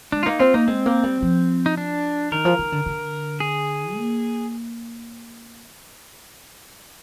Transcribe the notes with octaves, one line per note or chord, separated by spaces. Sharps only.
G#3 D4
F4
A#3 D#4
C4 F4
A#3 D#4
G#3 C4
A#3
G3
F3
D#4
D4
D#3 A#4
F3
D#3
D3
D3
G#4
A#3